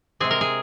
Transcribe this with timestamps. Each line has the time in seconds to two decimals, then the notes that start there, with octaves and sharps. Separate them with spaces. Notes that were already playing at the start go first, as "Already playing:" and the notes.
0.20 C3 G#3 C4 G#4
0.31 A#4
0.41 G#4